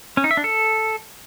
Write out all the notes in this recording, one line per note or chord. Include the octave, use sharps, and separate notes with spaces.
C#4
D#4
E5
D4
A4